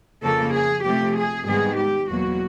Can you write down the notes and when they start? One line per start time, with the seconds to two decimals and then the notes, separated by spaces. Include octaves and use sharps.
0.23 F2 C#3 F3 A#3 A4
0.54 G#4
0.85 C3 F3 A3 G4
1.16 G#4
1.47 G#2 D#3 G3 B3 G#4
1.78 G4
2.09 E2 B2 F#3 A#3 F#4